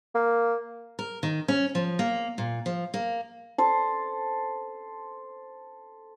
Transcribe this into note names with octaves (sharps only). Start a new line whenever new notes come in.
A#3
A#4
D#3
C#4
F3
A#3
A#2
F3
A#3
A4 C5 A5